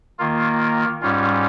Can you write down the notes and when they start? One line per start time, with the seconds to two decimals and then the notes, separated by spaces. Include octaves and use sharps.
0.19 D#3 A#3 F4
1.01 G#2 G3 C#4 F4